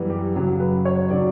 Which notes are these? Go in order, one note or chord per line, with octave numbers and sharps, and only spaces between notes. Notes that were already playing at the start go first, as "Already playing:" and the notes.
Already playing: F#2 E3 G3 B3
G4
F#2 C#3 F#3
B4
C#5
C#3 F#3 D5